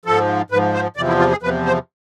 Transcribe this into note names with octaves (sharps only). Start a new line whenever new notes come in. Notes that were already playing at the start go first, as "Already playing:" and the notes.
G#2 F3 A4
G#2 F3 B4
C5
E2 C3 F3 D5
E4
F4
G#4
E2 C3 F3 B4
C5